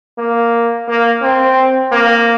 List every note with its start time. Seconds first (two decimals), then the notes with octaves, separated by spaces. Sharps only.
0.18 A#3
0.88 A#3
1.22 C4
1.92 A#3